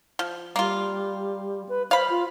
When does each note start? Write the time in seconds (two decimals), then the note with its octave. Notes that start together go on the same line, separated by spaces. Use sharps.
0.19 F3
0.56 G3 A#3 F4
1.69 B4
1.91 C5 F5 B5
2.10 F4